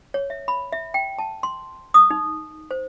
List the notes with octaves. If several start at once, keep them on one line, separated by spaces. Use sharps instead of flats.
C#5
E5
B5
E5
G5
A5
C6
D#6
D#4
C5